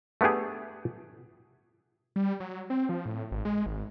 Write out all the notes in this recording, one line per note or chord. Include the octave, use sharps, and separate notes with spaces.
A3 B3 D4 G4 G#4
G3
F#3
C4
F3
A2
G#1
G#3
G#1